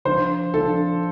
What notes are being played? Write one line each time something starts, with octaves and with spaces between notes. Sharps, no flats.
F3 D4 C5
F3 D4 A4